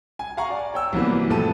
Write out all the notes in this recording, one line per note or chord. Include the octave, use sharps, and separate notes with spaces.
G#5
F5 F#5 G#5 A#5 C#6
D5
C#5 G5 E6
C2 C3 E3 F#3 A#3 B3
A1 F2 A3 A5 D#7